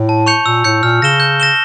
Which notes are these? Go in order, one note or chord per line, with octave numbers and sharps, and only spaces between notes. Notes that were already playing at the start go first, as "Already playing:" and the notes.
Already playing: A2
A5
C#6 G6 C#7 F7
A#2 E6
A2 G6 C#7
A#2 F6
C#3 A#6 E7 G7
G6
A#6 E7 G7